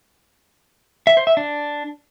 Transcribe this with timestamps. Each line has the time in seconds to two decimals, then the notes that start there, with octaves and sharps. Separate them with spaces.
1.07 E5
1.17 C5
1.27 E5
1.37 D4